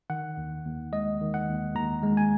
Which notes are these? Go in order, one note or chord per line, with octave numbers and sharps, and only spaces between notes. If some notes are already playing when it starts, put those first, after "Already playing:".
D#3 F#5
D#2
D#2
G#3 D#5
D#3
F#5
D#2
D#2 A#5
G#3
G#5